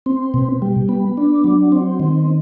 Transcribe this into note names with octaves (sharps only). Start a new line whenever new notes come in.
C4
B2
G3
B3
D4
F#3
C4
D#3